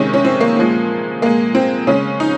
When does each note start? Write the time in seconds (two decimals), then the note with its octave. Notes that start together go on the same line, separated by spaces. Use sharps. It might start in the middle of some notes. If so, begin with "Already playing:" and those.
Already playing: C3 D#3 G#3 C#4
0.14 C#4
0.25 C4
0.40 A#3
0.57 A#2 F3 G#3
1.22 A#2 G#3 A#3
1.55 C4
1.87 C#3 G#3 C#4
2.20 D#4